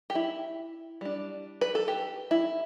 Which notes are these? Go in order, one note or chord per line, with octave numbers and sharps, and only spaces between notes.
G4
E4
G3 D4
B4
A4
G4
E4